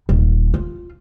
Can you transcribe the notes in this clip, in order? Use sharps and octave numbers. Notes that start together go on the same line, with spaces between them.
D#1
F4